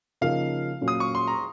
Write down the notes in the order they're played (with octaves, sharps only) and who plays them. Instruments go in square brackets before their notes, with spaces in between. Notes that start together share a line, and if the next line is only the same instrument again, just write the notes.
[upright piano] C#3 F3 A#3 D#4 [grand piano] F5
[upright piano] A#2 F#3 C#4
[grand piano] D#6
C#6
C6
A#5